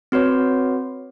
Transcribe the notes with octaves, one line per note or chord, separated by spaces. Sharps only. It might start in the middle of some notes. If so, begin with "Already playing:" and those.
C4 F#4 B4 C#5